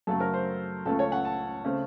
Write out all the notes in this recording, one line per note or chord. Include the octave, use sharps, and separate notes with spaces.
F#2 C#3 A3 A4
A#4
C5
C#2 C#3 A3 A4
C#5
F#5
A5
C#3 A3 C4